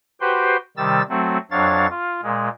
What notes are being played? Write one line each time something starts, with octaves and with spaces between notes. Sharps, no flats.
F#4 G4 B4 C5 G5 C6
C3 D#3 G3 E6 A6
F#3 A3 C4 F#4
F2 F#3 D4 C#5 F5 A6
F4
A#2 G#3